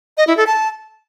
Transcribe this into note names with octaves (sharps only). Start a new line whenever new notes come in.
D#5
E4
A4
A5